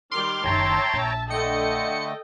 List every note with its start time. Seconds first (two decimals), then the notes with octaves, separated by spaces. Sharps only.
0.11 D#3 G3 C6 D6 F6
0.44 F#1 D#3 C#5 E5 G5 A5 A#5
0.94 A#1
1.30 D3 A3 A4 D#5 G5 C#7